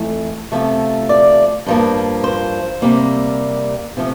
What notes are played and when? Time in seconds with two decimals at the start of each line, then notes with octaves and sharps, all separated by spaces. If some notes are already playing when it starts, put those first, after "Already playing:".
Already playing: F2 E3 A3
0.52 C3 F3 A3
1.09 D5
1.66 G2 F3 A#3
2.24 C5
2.82 C3 G3 A#3
3.97 C3 F3 A3